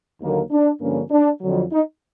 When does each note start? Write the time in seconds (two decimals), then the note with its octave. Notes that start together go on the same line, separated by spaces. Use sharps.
0.20 D#2 D3 F#3 A#3
0.50 D4
0.80 G2 D3 F3 A#3 C#4
1.10 D4
1.41 F2 D3 F#3
1.72 D#4